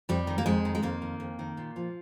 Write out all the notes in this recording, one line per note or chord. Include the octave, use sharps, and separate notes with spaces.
F2 G3
D#3
A#3
F2 G#3
D#3
G#3
F2 A#3
D#3
F2
D#3
A#2
F3